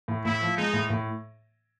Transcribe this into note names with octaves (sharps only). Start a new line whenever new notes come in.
A2
A2 E4
F3
G#3 D#4
A2
A2